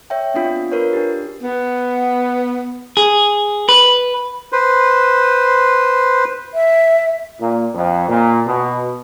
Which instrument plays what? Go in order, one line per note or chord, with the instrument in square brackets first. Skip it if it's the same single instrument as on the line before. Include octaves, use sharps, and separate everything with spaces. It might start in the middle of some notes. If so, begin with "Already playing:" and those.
[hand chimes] C#5 E5 G5
B3 C4 D4 F4
D4 F4 A#4 B4 C#5
D4 G4
[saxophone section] B3
[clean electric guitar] G#4
B4
[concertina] B4 C5
[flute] E5
[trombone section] A#2
F2
A#2
B2